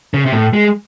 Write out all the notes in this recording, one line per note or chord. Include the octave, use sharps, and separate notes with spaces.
C#3
C3
A2
G#3